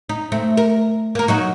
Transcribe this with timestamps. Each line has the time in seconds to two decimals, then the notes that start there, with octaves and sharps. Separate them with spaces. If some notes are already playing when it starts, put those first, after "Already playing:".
0.09 D#4
0.32 A3 C4
0.57 A#4
1.15 A#3 A#4
1.28 F#3 D#4 F#4